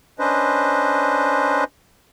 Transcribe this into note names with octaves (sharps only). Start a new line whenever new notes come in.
C#4 D4 B4 C5 D#5